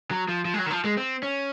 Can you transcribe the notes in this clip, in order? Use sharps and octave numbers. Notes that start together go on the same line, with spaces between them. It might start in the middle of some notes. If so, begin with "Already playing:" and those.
F#3
F3
F3
G#3
F#3
D#3
F3
G#3
C4
C#4